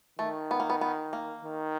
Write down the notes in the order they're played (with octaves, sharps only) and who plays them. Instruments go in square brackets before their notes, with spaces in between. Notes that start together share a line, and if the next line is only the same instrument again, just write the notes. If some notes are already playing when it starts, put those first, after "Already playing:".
[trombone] D#3 [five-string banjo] A3
[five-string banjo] B3
A#3
B3
B3
A#3
[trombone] D#3